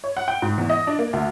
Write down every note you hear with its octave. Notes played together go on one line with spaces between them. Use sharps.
C#5
F#5
G5
G#2
E2
D#5
D4
A#3
D2